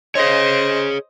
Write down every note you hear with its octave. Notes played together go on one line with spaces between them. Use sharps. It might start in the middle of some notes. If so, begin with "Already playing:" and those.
G#4 C5 C#5 D#5